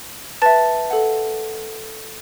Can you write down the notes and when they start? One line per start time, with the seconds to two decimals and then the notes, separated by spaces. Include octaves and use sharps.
0.42 B4 E5 A5 A6
0.91 A4 F#5